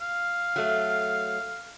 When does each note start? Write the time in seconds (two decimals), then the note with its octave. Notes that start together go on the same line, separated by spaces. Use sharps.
0.02 F5
0.56 F#3 A3